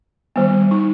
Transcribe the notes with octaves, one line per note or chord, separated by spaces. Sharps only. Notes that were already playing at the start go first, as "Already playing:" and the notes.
D#3 G3 B3
D#4